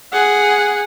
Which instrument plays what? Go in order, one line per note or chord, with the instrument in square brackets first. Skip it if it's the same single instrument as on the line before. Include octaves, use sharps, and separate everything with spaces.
[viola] G#4 F#5